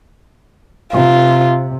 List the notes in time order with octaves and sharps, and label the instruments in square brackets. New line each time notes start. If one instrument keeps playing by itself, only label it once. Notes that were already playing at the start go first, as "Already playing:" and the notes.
[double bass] C3 [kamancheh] F4